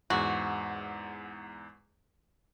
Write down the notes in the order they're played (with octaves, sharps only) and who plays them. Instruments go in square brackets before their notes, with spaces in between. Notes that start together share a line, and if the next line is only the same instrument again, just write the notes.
[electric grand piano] E2 G#2 [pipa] F#4